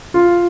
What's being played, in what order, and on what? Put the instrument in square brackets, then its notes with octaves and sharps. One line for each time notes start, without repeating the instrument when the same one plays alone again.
[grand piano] F4